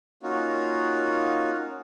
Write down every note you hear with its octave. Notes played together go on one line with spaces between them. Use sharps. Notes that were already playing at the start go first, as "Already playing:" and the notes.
A#3 C#4 D#4 F4 F#4